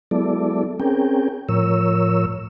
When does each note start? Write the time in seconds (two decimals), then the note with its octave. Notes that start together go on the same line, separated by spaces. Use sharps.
0.11 F#3 G#3 B3 E4 A4 D5
0.80 C4 C#4 G#4 A#4 G5
1.49 A2 F3 A#4 C#5 E6